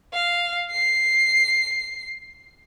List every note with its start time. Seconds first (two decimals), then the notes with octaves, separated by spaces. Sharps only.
0.14 F5
0.72 C7